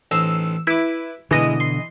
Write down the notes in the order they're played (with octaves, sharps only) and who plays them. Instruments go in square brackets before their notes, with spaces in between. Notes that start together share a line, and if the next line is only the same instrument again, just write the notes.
[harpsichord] A1 D#4 C5 [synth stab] E6
[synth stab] E4 [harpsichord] B4 D6
[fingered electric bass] B2 D3 [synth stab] E3 D#5 D#7 [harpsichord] G#3
[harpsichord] C6